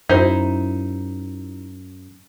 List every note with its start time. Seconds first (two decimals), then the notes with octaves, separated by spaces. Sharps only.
0.09 F#2 D#4 E4 C5